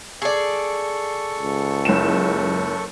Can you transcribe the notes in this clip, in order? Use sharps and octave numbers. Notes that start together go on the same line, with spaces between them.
G#4 A4 D5 C#6
C#2
F#1 E7